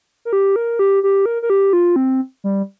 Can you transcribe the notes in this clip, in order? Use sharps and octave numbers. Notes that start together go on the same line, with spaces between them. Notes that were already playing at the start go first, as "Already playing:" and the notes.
A#4
G4
A#4
G4
G4
A#4
A#4
G4
F4
C4
G3